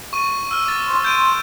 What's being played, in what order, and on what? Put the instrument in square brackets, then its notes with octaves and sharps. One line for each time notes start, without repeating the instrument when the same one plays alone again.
[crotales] C#6 D#7
E6 F6
D6 A6
[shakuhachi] C6
[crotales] G6 D7 D#7